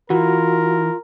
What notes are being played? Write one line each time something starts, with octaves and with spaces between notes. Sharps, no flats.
E3 F4 F#4 A#4